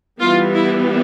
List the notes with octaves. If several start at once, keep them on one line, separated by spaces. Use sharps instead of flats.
E3 G3 B3 F4
E4